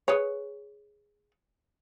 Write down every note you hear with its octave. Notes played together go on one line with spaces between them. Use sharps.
G#4 B4 C#5